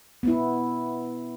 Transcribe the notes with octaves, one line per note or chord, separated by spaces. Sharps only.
B3 E4